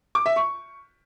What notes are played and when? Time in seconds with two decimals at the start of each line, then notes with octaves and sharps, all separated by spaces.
0.15 D6
0.26 E5
0.36 C#6